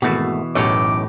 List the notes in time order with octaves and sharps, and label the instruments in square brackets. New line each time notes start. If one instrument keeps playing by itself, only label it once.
[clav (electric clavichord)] G#1 A3 F#4 [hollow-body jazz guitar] B2 E3
[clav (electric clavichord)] B1 F#2 C#5 [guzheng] A2 G4 [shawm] D6